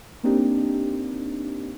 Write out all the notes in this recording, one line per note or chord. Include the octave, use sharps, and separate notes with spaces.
A#3 C4 D4 D#4 G4